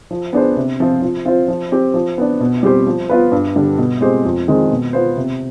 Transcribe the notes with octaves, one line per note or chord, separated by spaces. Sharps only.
F3
B3 D4 G#4 C5
C3
F3 C4 F4 C5
F3
C4 F4 C5
F3
C4 G4
F3
B3 D4
B2
G3 C4 G4 C5
F3
B3 F4 B4
G2
D3 G3 D4
B2
G#3 C4 G4 C5
F2
D#3 G#3 C4
B2
B3 F4 C5
C3